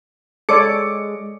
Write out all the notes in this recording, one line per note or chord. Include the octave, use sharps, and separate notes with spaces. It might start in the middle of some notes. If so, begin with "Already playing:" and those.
G#3 A4 C#5 D5 D6 C#7